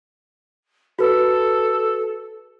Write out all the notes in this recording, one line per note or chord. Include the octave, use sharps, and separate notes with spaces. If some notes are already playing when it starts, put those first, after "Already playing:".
F#4 A4 B4